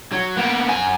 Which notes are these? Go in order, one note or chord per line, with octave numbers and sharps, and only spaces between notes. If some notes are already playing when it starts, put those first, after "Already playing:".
F#3
A#3 B3
F#2 G#5